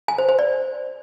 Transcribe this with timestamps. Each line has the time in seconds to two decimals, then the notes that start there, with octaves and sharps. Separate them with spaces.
0.08 G#5
0.18 C5
0.29 C5
0.39 D5